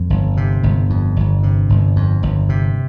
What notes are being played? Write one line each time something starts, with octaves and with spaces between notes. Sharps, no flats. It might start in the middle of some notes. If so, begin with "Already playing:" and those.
Already playing: F2
G1
C3
G1
F2
G1
C3
G1
F2
G1
C3